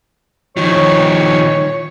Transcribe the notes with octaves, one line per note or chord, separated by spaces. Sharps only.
D#3 F3 C#5